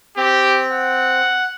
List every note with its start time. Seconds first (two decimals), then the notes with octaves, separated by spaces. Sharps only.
0.17 C4 G4
0.72 F#5